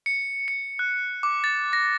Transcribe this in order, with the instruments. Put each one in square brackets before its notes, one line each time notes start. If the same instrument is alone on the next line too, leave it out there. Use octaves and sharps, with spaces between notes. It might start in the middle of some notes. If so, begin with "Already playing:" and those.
[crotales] C#7
C#7
F#6
D6
A6
A#6